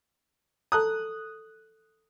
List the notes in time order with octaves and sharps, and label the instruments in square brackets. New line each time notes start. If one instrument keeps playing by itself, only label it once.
[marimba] A4 A5 A#5 [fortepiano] D#6 F#6